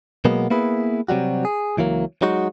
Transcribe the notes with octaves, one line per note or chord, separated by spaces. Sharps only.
B2 F#3 G#3 A#3 B3
A#3 B3 E4 G#4 B4
C3 F#3 G3 F#4
G#4
C#2 E3 F#3 A#3
F#3 G#3 D#4 F#4